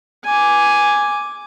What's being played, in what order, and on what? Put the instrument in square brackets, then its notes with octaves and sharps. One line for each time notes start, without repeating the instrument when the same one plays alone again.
[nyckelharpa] G#5 D6